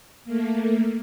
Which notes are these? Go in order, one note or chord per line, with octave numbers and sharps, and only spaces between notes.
A3 A#3